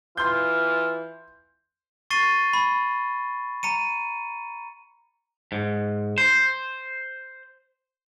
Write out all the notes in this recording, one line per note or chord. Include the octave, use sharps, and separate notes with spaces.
E3 F4 C6 G6
C#6 A6 C7 D#7 G7
B5
A#5 C#7 D#7
G#2
C5